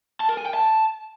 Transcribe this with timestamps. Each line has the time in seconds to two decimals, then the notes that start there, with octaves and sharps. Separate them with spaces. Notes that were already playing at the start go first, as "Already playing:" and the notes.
0.20 A5
0.29 A#4
0.37 G#5
0.46 G5
0.54 A5